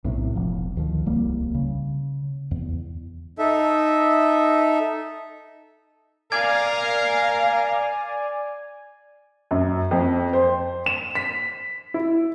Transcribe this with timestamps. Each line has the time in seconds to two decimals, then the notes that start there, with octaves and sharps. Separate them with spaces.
0.04 B1 A2 C3
0.35 E1 F3
0.77 D2 D#3 F3
1.06 D1 C2 G3 A#3
1.54 C#3
2.51 E2
3.39 D#4 A4 E5
6.32 A#4 D5 F5 G#5 G#6
9.51 F#2
9.91 F2
10.33 C5
10.86 E7
11.15 B6
11.94 E4